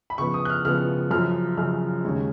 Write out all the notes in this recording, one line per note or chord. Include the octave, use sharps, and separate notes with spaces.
B5
C#3 F3 B3 C#6
D#6
F#6
F6
C#3 F3 B3 F6
F#2 C#3 F3 F6
F#2 C#3 F3 F6
D#2 C#3 G#3 C#4